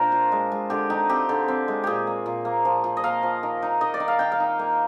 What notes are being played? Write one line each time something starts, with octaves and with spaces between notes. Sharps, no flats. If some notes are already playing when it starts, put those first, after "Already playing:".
Already playing: A#2 D4 A#4 C5 G5
F4
G#3
G#3
D3 G4
D#4 G4
C4 G4
D3
C4
G#3
A#2 G4 G#4
A#3
A#2
A#3
F3
F3
D#5
A#3 F5
F3
D#3
D#4
D#3 D#5
D5
D#3
F5
D#3 G5
F5
D#4
A#3